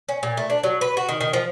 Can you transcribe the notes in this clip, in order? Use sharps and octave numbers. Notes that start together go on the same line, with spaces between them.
C#4
A#2
A3
D4
F#3
B4
F#4
D#3
D#3
F3